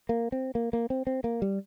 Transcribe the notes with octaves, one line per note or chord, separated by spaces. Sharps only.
A#3
C4
A#3
A#3
C4
C4
A#3
G3